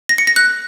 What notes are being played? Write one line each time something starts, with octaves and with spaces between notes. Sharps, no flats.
A#6
C#7
A#6
F#6